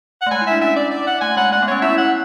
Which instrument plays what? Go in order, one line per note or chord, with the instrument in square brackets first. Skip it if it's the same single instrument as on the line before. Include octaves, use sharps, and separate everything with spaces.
[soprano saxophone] F#5
[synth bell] A3
[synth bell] G#3 [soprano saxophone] G#5
[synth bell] E4
[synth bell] D4 [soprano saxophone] E5
[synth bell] C#4 [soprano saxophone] E5
[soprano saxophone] D5
D5
F#5
[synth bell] A3 [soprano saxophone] G#5
[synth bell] G#3 [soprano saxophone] F#5
[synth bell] A3 [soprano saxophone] F#5
[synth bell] B3
[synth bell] C#4 [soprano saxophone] C#5
[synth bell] E4 [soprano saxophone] E5
[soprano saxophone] F#5